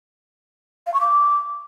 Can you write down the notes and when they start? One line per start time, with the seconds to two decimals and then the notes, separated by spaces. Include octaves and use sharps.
0.87 F5
0.94 C#6
1.01 D6